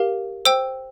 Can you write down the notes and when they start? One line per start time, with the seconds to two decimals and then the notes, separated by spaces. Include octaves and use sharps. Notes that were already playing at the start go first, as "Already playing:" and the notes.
Already playing: G4 A#4 F5
0.45 C5 G5 E6